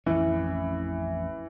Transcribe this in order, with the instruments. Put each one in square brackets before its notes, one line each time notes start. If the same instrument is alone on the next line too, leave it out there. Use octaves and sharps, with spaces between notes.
[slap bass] A1 F2 C#4 [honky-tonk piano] E3